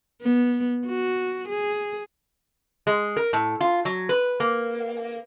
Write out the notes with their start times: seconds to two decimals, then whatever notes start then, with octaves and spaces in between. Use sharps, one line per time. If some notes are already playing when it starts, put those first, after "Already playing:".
0.22 B3
0.86 F#4
1.48 G#4
2.87 G#3
3.17 A#4
3.33 A2
3.61 F4
3.85 F#3
4.09 B4
4.40 A#3